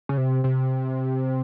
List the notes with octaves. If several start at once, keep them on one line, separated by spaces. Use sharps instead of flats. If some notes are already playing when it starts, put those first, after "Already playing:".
C#3
C3
C3